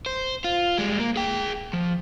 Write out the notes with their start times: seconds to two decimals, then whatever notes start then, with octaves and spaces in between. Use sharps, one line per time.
0.06 C5
0.44 F4
0.78 G3 G#3
0.99 A#3
1.16 G#4 G5
1.73 F3